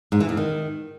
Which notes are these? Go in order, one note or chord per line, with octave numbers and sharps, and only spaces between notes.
G#2
E3
E2
D#3